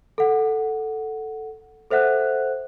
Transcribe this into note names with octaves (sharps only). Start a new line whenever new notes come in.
A4 F#5
A4 C5 E5 F#5 F#6